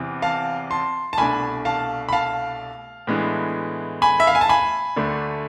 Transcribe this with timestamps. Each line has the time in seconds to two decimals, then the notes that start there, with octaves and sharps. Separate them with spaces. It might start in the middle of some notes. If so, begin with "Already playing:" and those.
Already playing: E2 C3 E3
0.22 F5 A5
0.71 A5 C6
1.13 A5
1.18 C2 B2 A3 D4 G#5 B5
1.65 F5 A5
2.09 B5
2.13 F5 A5
3.07 A2 E3 G#3 B3 D4
4.02 G#5 B5
4.20 E5
4.27 F5
4.35 G#5
4.41 A5
4.49 G#5 B5
4.96 D2 D3 A3 D4